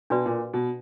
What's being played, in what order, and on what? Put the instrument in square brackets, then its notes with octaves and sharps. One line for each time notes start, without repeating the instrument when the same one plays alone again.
[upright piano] B2 [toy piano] D4 F#4 B4 D5
[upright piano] A#2
B2